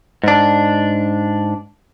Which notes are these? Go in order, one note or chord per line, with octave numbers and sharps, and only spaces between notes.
G#2 D4